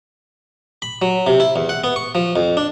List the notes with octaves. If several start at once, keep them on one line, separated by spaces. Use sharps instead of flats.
B5
F#3
C3
E4
E2
F#5
B3
C#6
F3
F2
D4